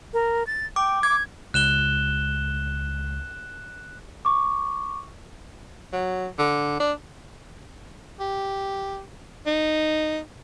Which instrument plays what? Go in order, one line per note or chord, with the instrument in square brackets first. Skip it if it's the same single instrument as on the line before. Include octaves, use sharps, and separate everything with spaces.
[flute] A#4
A6
[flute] G5 [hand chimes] D6
[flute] D6 [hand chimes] G#6
[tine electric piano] C#2 [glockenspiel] F#6 E7 G7
[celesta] C#6 D6
[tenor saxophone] F#3
D3
D4
[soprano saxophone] G4
D#4